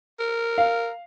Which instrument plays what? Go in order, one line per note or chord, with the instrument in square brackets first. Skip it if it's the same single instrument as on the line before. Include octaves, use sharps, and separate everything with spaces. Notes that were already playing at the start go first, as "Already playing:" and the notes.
[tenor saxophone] A#4
[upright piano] F5